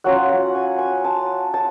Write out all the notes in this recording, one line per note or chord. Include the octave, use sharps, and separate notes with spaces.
F#3 C#4 F4 F#5
F#5
G#5
G#5
A5
A5